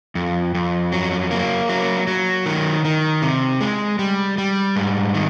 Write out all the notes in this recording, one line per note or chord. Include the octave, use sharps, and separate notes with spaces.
F2
F2
F#3
A#3
F#3
F#3
D#3
D#3
C3
G#3
G3
G3
G#2
D#3